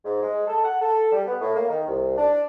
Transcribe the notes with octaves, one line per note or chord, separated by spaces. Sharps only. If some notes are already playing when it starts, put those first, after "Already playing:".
G#2
G#3
A4
F#5
A4
G3
B3
A2
A#3
D#3
C2
D4